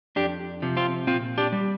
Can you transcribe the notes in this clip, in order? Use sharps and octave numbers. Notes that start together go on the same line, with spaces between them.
F2 D4 G4
C3 F3
C4 F4
A#2 C4 F4
D4 G4
G3